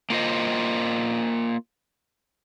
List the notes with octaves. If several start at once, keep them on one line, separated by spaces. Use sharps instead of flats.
A#3 F4 C5 D#5